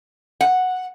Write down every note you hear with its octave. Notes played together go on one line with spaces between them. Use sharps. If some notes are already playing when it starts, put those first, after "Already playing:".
F#5